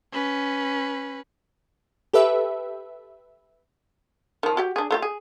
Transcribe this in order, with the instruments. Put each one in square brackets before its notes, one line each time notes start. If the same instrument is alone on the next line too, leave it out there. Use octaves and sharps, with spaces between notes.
[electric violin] C#4 B4
[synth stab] G4 A4 B4 E5
[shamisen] D#3 F3
F#4 G4 G5
D4 G#4
A3 F4 G4
G#4